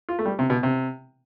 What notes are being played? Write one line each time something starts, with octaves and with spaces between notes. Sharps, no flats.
F4
A3
G3
C3
B2
C3